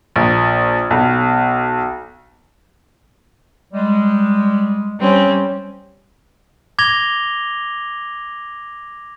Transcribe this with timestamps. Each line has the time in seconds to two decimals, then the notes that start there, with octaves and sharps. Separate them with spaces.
0.16 A#1
0.90 B1
3.74 G3 G#3
4.99 G3 C4 C#4
6.79 D6 G#6 A#6 F7 G7